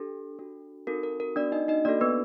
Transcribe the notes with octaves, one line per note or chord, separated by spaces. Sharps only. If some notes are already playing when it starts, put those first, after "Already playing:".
Already playing: D4 G4 A4
D4 F#4 A4
C4 D#4 F#4 A4 A#4
A#4
A#4
B3 D4 F#4 D5
D#4 D#5
D#4 D#5
A#3 D4 D#4 F#4 A4 D5
B3 B4